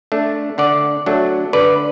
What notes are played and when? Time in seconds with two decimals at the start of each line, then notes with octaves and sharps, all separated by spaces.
0.12 A3 D4
0.58 D3 D5 F#5
1.06 F#3 A3 D4
1.53 D3 B4 D5